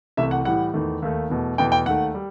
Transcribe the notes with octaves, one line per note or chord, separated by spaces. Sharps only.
C2 C3 E3 A3 E5
F#5
A2 E3 G3 F#5
E2 D#3 A3
D#2 D#3 A3
E2 B2 A3
E2 B2 A3 G5
G5
D#2 D#3 A3 F#5
G3